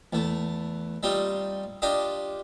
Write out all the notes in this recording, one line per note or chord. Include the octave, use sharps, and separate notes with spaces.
E2 A3
G3 C4 D#4 F4
D4 F4 G4 D#5